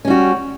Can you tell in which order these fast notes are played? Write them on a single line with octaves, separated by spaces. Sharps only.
C#4 G3 F#4